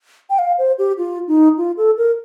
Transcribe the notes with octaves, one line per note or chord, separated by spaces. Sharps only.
G5
F5
C5
G4
F4
D#4
F4
A4
A#4